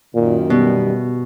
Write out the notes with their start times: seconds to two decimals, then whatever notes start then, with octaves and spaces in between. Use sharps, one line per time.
0.15 F#2 A#2 D#3
0.50 B2 G3